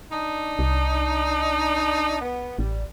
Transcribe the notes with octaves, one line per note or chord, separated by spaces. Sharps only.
D4 D#4
C2
B3
A1 G3